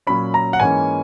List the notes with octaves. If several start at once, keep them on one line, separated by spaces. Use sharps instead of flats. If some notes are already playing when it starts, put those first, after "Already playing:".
A#2 F#3 C#4 B5
A#5
F#5
G#2 E3 A#3 C#4 G#5